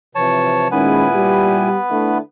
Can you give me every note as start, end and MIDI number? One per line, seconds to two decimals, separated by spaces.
0.15 0.68 48
0.15 0.68 52
0.15 0.68 53
0.15 0.68 73
0.15 0.68 81
0.71 1.69 46
0.71 1.06 51
0.71 1.06 56
0.71 2.18 59
0.71 1.06 61
0.71 1.69 64
0.71 2.18 71
0.71 1.69 80
1.15 1.74 55
1.15 1.74 67
1.90 2.18 50
1.90 2.18 57
1.90 2.18 64